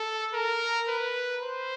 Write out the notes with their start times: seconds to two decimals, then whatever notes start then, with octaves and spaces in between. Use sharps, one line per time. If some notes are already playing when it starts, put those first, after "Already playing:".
Already playing: A4
0.33 A#4
0.88 B4
1.43 C5